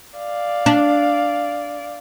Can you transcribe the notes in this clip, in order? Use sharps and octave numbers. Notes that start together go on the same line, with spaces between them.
D5 F5
D4